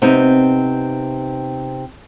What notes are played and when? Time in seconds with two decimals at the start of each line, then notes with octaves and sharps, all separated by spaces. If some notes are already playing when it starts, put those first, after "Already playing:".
0.02 C3 B3 C4 D#4